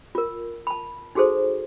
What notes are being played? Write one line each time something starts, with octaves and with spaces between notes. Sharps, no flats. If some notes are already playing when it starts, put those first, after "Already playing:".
F4 A#4
A5 B5
D#4 F#4 G#4 A4 C5